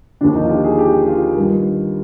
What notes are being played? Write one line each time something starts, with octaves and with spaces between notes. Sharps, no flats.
D#2 D3 F3 D4
D#4
F4
G4
G#4
G4
F4
G2 D#3